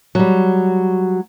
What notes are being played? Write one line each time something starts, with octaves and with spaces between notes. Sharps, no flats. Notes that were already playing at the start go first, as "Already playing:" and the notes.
F#3 G3